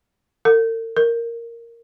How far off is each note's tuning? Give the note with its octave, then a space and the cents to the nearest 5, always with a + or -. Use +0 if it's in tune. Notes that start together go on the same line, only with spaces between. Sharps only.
A#4 -45
A#4 -5